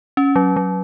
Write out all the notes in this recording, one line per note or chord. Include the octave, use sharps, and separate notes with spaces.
C#4
F#3
F#3